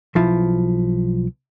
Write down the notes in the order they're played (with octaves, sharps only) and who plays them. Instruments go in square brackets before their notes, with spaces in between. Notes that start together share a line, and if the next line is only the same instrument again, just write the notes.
[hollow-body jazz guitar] B1 F3 E4